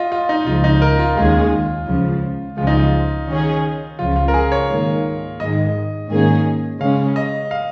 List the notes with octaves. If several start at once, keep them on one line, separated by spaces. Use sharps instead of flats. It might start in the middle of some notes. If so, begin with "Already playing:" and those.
Already playing: F4 D#5
F4
D#4
C#2 C#3 F3 F4
D#4
A#4
F4
D#2 D#3 G#3 C#4 F4 G#4
C#2 C#3 F3
C#2 C#3 F3 G#3 F4
D#4
F4
D#3 C#4 G#4
C#2 C#3 F3 F4
F4
A#4
G#4
C#5
G#2 D#3 A#3
G#2 D#3 G#3 D#5
G#2 D#3 A#3 C#4 G#4
C#3 G#3 C#4 F5
D#5
F5